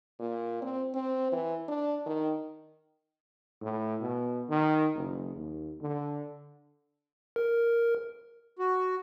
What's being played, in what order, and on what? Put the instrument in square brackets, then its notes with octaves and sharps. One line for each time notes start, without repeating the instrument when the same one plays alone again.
[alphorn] A#2
C4
C4
E3
D4
D#3
[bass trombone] A2
B2
D#3
F#1
D#2
D3
[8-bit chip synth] A#4
[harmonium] F#4